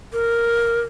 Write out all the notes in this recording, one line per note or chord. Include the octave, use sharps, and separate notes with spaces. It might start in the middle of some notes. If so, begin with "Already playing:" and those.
A#4